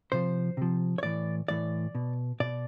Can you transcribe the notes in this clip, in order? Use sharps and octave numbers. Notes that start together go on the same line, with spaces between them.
C3 F3 C5
C3 F3
C#5
A2 E3 D5
A2 E3 D5
B2
B2 D5